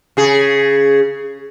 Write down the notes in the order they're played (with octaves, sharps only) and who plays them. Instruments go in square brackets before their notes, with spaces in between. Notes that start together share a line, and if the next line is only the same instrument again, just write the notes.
[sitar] C#3 G#4